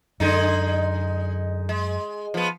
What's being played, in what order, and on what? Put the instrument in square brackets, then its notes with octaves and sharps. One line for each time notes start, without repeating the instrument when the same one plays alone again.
[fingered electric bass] F#2 [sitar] D3 G#3 D#4
[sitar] G#3
F3 B3